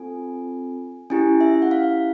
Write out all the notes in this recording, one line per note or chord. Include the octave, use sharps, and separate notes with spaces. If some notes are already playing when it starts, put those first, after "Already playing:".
Already playing: C4 F4 A4 G#5
C#4 E4 G4 G#5
E5
F#5
F5